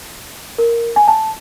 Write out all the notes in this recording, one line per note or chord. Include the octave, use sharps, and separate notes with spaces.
A#4
G#5
A5